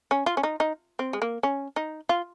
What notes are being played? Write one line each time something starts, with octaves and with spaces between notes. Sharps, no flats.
C#4
F4
C#4
D#4
D#4
C4
G#3
A#3
C#4
D#4
F4